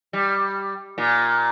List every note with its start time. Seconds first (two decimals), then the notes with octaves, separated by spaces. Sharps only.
0.13 G3
0.98 A#2